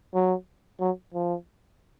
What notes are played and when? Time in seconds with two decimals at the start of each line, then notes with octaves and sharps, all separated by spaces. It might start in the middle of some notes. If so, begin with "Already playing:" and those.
0.14 F#3
0.80 F#3
1.14 F3